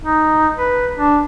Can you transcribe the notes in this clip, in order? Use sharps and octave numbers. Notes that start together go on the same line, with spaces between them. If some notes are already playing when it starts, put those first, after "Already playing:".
D#4
B4
D4